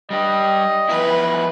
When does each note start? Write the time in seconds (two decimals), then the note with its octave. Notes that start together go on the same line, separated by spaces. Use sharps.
0.10 G3 D4 G4 D#5
0.89 F3 B3 E4 B4